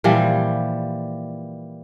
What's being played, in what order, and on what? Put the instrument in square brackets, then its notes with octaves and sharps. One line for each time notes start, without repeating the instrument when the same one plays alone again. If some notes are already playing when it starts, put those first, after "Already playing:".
[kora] A#2 E3 F3 G3